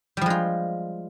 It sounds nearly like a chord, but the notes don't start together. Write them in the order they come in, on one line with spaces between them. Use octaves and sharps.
G3 F3 G#3 F4